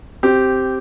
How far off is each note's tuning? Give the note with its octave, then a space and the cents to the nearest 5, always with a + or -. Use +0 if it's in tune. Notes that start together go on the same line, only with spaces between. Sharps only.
C4 +0 G4 -10